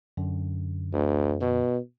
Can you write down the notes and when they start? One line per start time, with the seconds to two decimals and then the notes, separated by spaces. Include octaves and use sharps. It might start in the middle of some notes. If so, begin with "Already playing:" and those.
0.17 F#2 D3
0.93 D2
1.40 B2